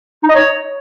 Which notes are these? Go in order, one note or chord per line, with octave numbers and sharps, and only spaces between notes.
D#4
D#5
C#5